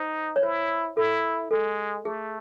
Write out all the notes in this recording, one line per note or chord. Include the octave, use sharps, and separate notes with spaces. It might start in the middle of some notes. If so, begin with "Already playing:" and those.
Already playing: D#4 C5
C#5
E4 C5
E4 A4
G#3 A4
A3 G#4